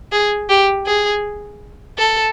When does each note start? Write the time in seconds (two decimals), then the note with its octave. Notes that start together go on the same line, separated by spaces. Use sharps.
0.12 G#4
0.49 G4
0.86 G#4
1.98 A4